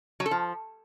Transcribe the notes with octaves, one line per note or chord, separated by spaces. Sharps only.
F#3
A4
F3